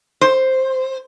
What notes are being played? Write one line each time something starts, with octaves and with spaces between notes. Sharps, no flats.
C5